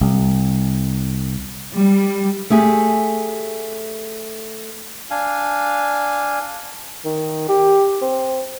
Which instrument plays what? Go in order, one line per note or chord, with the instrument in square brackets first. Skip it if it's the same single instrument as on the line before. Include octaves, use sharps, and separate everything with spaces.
[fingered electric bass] C2
[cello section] G3
[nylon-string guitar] A3 G4 G#4
[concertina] D4 F5 G#5
[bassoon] D#3
G4
C4